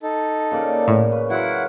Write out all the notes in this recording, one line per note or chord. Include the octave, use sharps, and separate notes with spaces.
D#4 A4
C#3 A#3 D5
A2
C#4 B4
F#3 E4 F4 F#5